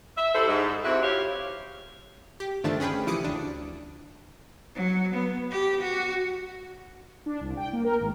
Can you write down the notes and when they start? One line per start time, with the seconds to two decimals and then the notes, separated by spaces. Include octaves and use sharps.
0.17 E5
0.34 G3 E4 A4 C5
0.48 G#2
0.84 C3 C4 E4 F#4
1.03 F4 G4 C#5 F5
2.40 G4
2.64 G1 D#3 F3 A3 D4 A5
2.80 C#4 G#4 B4 G5
3.07 C3 E3 F3 D6 D#6 C#7
3.25 D2 D4
4.75 F#3
5.15 B3
5.52 G4
5.82 F#4
7.26 D4
7.41 C2
7.57 G5
7.73 A#3
7.84 A#4
8.00 G#1